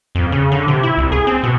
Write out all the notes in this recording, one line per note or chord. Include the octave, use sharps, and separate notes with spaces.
F2
C#3
D3
C3
E4
C2
G#4
C4
B2